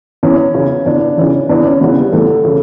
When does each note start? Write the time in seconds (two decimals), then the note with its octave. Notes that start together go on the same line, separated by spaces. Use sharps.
0.23 E2 C#4
0.54 C#3 E3
0.86 E2 D4
1.18 C#3 E3 C#4
1.49 E2 D4
1.65 C#4
1.81 C#3 E3 B3
1.97 G3
2.12 E2 A3
2.45 C#3